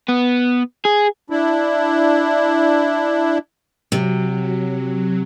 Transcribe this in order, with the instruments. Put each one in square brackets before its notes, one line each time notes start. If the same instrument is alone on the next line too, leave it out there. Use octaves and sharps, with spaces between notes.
[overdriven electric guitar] B3
G#4
[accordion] D4 E4
[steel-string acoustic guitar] C3 [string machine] F#3